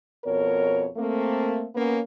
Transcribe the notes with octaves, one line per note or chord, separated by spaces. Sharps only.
F2 B2 A#4 C#5
A3 A#3 C4
A#3 B3 C#4